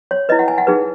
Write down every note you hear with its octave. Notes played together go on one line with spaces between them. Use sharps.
C#5
E4 B4 D#5
F#5
G#5
F#5
D#4 G#4 B4